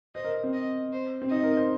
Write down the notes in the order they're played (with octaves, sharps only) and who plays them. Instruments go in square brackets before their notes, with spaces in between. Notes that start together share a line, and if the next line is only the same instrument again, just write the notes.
[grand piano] C5 [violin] D#5
[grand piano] A#4
C4
[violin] D#5
C5
[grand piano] C4
[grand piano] D#4 [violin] D#5
[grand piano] A#4
C5